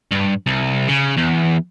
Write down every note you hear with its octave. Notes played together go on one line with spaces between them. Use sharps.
G2
C2
C#3
E2